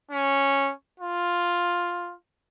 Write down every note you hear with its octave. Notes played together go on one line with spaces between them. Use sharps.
C#4
F4